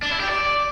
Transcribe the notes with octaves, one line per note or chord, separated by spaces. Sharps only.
D4
E4
G4
D5